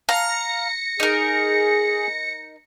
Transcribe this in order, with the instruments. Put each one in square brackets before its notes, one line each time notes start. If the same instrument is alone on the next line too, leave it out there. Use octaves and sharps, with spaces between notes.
[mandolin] F5 A#5 [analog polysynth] A#6 C#7
[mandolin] D#4 A#4 [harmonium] G#4